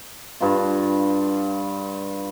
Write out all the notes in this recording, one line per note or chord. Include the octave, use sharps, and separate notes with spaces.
G2 F4